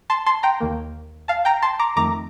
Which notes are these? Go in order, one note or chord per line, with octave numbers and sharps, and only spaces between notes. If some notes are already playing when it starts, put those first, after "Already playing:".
A5 C6
A5 C6
G5 A#5
D#2 D#3 A#3
F5 A5
G5 A#5
A5 C6
A#5 D6
F2 D#3 A3 A#5 D6